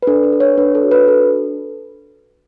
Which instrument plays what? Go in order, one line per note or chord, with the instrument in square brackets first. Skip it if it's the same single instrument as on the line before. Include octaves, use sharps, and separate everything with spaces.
[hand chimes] B4
D4 A4
B4
A4
C#5
D4 B4
A4
F#4
B4
D4 A4